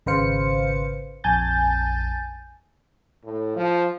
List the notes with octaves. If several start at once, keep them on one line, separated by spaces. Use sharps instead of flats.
G#1 C#3 B4 C5 F5 C#7
A#1 F2 G#5 A5 G6 A6
A2
F3